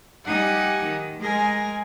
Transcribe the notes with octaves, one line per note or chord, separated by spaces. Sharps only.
G3 D#4 G4 F#5 G#5 D#6
D#3
G#3 G#4 A#4 G#5 A#6